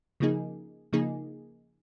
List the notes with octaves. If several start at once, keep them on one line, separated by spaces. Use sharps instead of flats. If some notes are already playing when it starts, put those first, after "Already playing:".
C#3 F3 A#3 D#4 G#4
C#3 F3 A#3 D#4 G#4